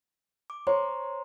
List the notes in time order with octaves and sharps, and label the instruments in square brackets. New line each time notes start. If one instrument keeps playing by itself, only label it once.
[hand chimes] D6
[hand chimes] C5 A#5 C6 [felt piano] C#5